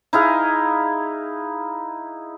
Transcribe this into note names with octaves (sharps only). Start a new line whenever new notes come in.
D#4 E4 G#4 F5